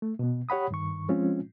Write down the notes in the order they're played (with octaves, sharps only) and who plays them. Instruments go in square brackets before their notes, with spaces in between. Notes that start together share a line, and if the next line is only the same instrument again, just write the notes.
[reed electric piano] A3
B2 B3
G4 C#5 F#5 B5 D#6
G2 D#3 C#6
F3 G#3 C4 C#4 F4